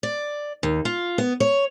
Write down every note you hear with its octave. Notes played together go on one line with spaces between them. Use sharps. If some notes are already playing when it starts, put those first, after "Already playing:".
D5
D#2
F4
B3
C#5